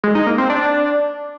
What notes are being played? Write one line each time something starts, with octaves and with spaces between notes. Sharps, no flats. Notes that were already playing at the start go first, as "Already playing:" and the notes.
G#3
D#4
A#3
C4
D4